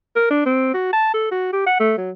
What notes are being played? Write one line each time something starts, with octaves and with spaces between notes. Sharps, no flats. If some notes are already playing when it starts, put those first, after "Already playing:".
A#4
D4
C4
F#4
A5
A4
F#4
G4
F#5
A3
F#3